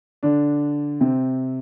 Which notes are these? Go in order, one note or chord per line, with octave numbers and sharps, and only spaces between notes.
D3 D4
C3 C4